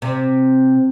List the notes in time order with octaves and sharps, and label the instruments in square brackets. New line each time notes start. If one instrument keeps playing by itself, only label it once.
[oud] C3